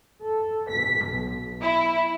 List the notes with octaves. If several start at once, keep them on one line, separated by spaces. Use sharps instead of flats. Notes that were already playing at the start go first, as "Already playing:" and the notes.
A4
B6
B1
E4